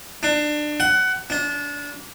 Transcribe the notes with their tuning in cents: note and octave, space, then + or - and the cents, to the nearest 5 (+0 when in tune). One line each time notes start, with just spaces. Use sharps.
D4 +25
F#5 +20
D4 -25